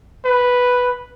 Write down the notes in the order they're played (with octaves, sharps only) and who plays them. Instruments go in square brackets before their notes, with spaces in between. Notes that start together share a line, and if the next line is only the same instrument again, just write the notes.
[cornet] B4